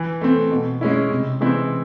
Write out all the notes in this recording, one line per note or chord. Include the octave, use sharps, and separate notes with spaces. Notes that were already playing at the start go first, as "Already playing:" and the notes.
Already playing: E3
A3 C4
B2
G#3 C#4 E4
C3
E3 G#3 C4 E4